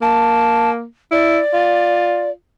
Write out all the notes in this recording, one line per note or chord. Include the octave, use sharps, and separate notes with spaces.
A#3 A5
E4 D5
F4